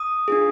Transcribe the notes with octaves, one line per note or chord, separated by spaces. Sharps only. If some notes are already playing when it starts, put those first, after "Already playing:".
Already playing: D#6
D4 F4 G#4